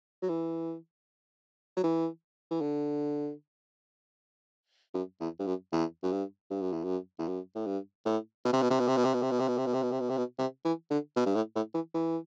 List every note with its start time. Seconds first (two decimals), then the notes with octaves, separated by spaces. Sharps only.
0.22 F#3
0.29 E3
1.77 F#3
1.84 E3
2.51 E3
2.61 D3
4.94 F#2
5.20 E2
5.39 G2
5.46 F#2
5.72 E2
6.03 F#2
6.12 G2
6.50 G2
6.61 F#2
6.72 E2
6.84 F#2
7.19 E2
7.28 F#2
7.55 A2
7.66 G2
8.05 A2
8.45 B2
8.53 C3
8.62 B2
8.70 C3
8.80 B2
8.88 C3
8.97 B2
9.05 C3
9.14 B2
9.22 C3
9.31 B2
9.40 C3
9.48 B2
9.58 C3
9.66 B2
9.74 C3
9.82 B2
9.92 C3
10.00 B2
10.09 C3
10.18 B2
10.38 C3
10.65 E3
10.90 D3
11.16 B2
11.26 G2
11.35 A2
11.55 A2
11.74 E3
11.94 E3